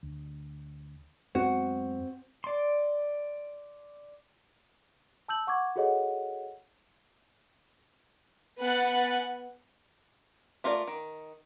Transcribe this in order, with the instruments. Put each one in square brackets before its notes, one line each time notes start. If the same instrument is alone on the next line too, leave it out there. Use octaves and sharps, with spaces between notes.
[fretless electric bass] D2
[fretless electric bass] F#2 G#3 B3 [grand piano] C4 [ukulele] F#4
[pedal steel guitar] D5 C6
[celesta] A5 E6 G6 F#7
F#5 C#6 D6 G#6
F#4 G#4 A4 C#5 D#5 F#5
[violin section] B3 B4 F#5 G#5 F#6 A6
[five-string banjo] A3 F4 A#4 C5 D5
D#3